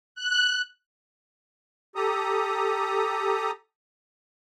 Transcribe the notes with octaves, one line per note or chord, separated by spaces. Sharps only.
F#6
G4 A4 A#5 D#6